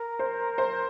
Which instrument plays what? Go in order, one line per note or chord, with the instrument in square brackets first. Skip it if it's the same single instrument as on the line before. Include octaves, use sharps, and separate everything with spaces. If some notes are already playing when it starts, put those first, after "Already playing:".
Already playing: [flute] A#4
[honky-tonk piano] C5
C5